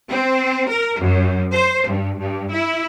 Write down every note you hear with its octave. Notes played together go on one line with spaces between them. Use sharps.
C4
A#4
F#2
C5
G2
G2
E4